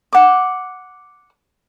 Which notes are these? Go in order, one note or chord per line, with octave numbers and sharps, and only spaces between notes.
F#5 D6